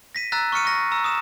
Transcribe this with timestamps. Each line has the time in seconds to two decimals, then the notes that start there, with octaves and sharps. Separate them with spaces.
0.15 A#6 B6 D#7
0.32 A#5 E6 F#6 A6 B6
0.52 C#6 F6 C#7 D#7
0.65 C#6 A#6
0.91 A#5 E6
1.04 D#6 E7